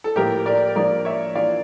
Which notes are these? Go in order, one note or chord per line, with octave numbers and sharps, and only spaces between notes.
A4
A2 F3 A#3 E4 G4 A#4
A#4 D5
F3 A#3 D4 A#4 D5
C#5 E5
E3 A#3 D4 F4 D5 F5